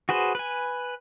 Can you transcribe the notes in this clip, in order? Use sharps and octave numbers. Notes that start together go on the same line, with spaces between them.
F#4 G#4 B4 C5
B4 G#5